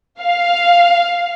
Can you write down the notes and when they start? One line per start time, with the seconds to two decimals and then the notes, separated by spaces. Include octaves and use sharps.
0.21 F5